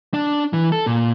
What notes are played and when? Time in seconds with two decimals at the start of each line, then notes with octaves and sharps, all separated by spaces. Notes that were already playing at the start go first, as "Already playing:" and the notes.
0.14 D4
0.53 E3
0.72 A4
0.86 A#2